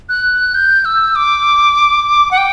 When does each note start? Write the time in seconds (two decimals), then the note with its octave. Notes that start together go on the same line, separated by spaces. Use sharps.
0.09 F#6
0.55 G6
0.85 E6
1.16 D6
2.31 F#5
2.38 G5